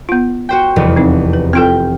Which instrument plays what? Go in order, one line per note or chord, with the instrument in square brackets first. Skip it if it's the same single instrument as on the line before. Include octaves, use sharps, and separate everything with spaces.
[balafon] B3 F4
[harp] F#4 C5 G5
F1 E2
[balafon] C4 D#4
B4
[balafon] C4 F4 A4 [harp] G5 F6